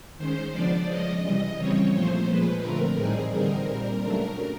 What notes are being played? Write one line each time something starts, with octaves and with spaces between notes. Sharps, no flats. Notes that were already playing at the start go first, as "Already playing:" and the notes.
D#3 G#3 C#4 C5
C#3 F3 G#3 B3 D4 D5
F3 G#3 C#4 D#5
C3 E3 G3 D#5
C#3 E3 G3 C4 C#5
A#2 F3 A3 C5
A#2 F3 G#3 B4
D3 F3 A3 C4 A#4
A2 E3 G3 C4 D#4 G#4
D3 G3 C4 D#4 A#4
A#2 G3 C4 A#4
C#3 F#3 A3 D4